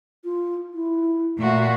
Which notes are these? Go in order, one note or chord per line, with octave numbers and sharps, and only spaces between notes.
F4
E4
A#2 A3 F#4